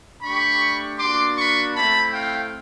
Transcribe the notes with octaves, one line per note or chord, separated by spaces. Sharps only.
A3 D4 G4 B5 C#6
A#3 D4 F#4 C6 D6
B5 C#6
A3 C4 E4 A5 B5
F5 G5